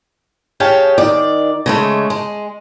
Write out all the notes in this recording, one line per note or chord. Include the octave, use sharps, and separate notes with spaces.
G4 G#4 C#5 F5 G5 A5
D#3 D5
C#3 G#3 A3
G#3